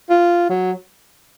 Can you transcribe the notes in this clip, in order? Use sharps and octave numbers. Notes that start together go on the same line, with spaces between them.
F4
F#3